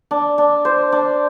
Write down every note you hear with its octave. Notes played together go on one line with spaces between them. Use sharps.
D4
D4
C5
D4